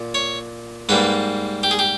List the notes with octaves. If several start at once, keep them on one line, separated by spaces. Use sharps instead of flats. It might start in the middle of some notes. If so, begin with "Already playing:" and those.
Already playing: A#2
C#5
G#2 G3 A#3 B4
G4
G#4
G4